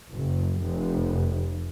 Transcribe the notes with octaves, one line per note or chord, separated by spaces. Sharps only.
F#1
F1